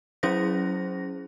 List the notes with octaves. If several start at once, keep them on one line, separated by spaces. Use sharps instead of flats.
F#3 C#4 E4 G#4 C5 A#6